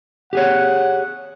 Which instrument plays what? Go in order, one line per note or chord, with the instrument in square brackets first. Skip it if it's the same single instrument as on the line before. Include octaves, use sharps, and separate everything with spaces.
[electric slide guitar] G4 G#4 C#5 [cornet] F#5